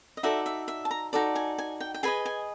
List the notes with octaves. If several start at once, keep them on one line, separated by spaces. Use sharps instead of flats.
D#5
D#4 F#4 A4 D5 E5
E5
E5
A5
A#5
D#4 F#4 A4 D5
G#5
G#5
G5
G5
G#4 B4 D#5 G#5
G#5